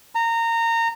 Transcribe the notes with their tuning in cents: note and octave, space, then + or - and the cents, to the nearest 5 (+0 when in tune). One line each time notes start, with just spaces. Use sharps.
A#5 -20